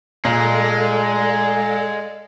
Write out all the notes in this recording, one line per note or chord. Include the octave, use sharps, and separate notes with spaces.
A#2 G#3 A4 D5 F5